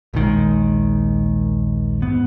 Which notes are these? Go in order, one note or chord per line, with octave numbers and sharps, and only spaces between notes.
A#1 D#2 D#3 G#3
G#2 B3